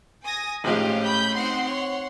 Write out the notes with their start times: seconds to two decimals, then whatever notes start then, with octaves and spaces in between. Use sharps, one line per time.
0.23 G#5 D#6 A#6
0.64 G#1 A2 F3 G#3 C#4 G4 C5 F5
1.03 B5 G6
1.36 C4 D#4 C5 F#5 C6
1.68 C#5